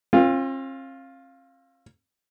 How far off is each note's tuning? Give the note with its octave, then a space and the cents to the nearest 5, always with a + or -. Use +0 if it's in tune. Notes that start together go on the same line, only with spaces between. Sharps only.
C4 +45 F4 +0